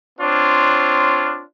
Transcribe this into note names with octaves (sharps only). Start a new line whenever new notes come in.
C4 D4 F4 C#5